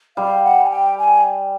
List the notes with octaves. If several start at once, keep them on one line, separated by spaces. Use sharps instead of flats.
G3 F5
F#5
G#5
G5
G#5